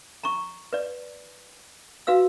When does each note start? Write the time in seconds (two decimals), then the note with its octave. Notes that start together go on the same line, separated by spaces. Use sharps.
0.24 A#5 C#6
0.73 B4 D5
2.07 F#4 B4 F5 E6